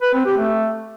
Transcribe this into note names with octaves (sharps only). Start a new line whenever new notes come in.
B4
C4
G4
A3